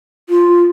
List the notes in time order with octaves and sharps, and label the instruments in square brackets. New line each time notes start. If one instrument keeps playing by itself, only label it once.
[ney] F4